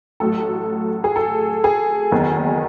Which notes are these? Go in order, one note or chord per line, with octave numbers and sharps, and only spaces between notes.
A1 A2 F#3 A4
G#4
A4
G#4
F#1 E2 D#3